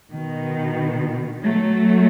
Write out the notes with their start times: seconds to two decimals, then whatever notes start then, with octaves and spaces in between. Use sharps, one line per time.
0.13 B2 D#3
1.43 F#3 A3